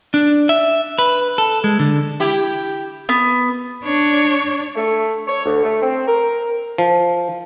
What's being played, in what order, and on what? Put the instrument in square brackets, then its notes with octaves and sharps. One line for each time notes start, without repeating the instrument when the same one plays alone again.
[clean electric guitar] D4
E5
B4
A4
G#3
D3
[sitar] E4 G4
[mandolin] B3
[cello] D4 [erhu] C#5
[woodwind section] A3
C#5
D2
A3
C4
A#4
[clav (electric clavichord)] F3